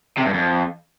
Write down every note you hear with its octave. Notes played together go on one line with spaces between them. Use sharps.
C3
G2
F2